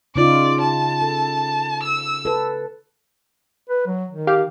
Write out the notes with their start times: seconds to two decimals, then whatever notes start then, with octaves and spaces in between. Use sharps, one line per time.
0.16 C#3 D#4 F4 D5
0.61 A5
1.02 A4
1.83 E6
2.25 A4 B4
3.70 B4
3.86 F#3
4.11 D#3
4.27 G4 F5